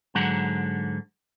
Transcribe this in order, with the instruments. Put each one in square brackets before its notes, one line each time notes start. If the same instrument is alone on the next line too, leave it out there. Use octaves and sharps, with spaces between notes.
[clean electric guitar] G#2 D3 F#3 F#5